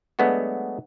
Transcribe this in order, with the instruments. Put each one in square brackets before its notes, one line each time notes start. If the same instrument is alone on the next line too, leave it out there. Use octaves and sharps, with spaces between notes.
[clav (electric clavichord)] F#3 G#3 A3 B3 D4 F#4